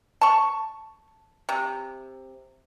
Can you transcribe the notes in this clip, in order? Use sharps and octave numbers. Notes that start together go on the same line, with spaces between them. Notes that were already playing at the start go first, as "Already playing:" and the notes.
A5 C#6
C3